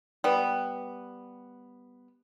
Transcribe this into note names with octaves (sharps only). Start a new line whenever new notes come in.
G3 B3